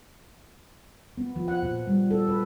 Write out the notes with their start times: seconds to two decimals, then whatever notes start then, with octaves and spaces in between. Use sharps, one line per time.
1.18 B3
1.36 F3
1.48 F#5
1.63 A#2
1.87 G3
2.11 A4
2.28 B4